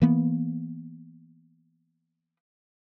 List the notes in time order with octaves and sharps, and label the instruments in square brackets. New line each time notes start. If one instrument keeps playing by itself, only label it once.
[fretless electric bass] E3 A#3 B3